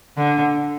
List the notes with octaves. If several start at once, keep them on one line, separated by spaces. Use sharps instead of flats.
D3